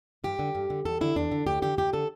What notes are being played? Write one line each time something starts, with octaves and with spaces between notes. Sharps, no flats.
G2 G4
D3
G2
D3
E2 A4
D3 E4
E2 D4
D3
D2 G4
D3 G4
D2 G4
D3 A4